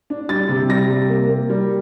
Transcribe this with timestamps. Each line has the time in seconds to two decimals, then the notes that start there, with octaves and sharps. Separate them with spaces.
0.10 D4
0.29 G3 A6
0.49 C3
0.69 G3 A#6
0.89 C3
1.09 A#3
1.29 A#3
1.50 G3